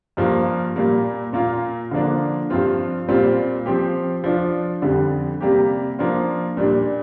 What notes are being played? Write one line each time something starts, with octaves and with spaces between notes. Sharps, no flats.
G2 F3 A#3
A#2 G3 A#3
A#2 A#3 F4
D3 F3 A#3 D4
G2 F3 C4 F4
A#2 G3 C4 F4
F3 C4 G4
F3 D4 F4
F2 D3 G3
C3 G3 A#3 G4
F3 A#3 D4 F4
A#2 G3 D4